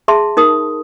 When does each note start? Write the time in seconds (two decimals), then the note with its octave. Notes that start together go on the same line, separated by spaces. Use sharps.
0.08 G#4 E5 A5 C6
0.37 D#4 A#4 D#6